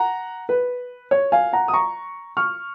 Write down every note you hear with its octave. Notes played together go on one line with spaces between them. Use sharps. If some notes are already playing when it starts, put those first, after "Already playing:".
Already playing: F#5 A#5
B4
C#5
F5 G#5
F#5 A#5
D#6
A#5 C#6
C#6 F6